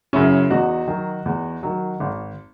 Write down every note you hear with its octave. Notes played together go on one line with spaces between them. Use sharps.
F#2 C#3 C#4 E4
E2 D#4 F#4
D#3 F#3
E2
D#3 F#3
G#1